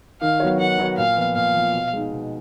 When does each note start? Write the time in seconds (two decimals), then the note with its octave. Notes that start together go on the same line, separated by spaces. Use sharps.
0.21 D#3 F5
0.40 F#3 B3 F#4 C#5
0.59 D#3 F#5
0.78 F#3 B3 F#4 C#5
0.97 A#2 F5
1.16 F3 B3
1.35 A#2 F5
1.55 F3 B3
1.73 B2
1.93 G#3 D#4
2.12 B2